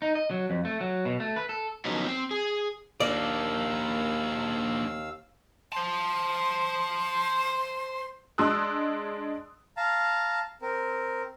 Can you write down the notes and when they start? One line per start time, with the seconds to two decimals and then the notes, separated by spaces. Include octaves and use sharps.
0.02 D#4
0.15 D#5
0.31 F#3
0.50 F2
0.65 A3
0.81 F#3
1.05 B2
1.20 A3
1.36 B4
1.49 A4
1.85 D3 F3 F#3 B3 C#4 D#4
2.06 C4
2.31 G#4
3.00 D#2 A#3 D4 D5 F5 E6
5.72 C5 A5 C6
8.38 G#3 D4 C6 D#6 E6 F#6
9.77 F5 A5 A#5
10.62 C4 A#4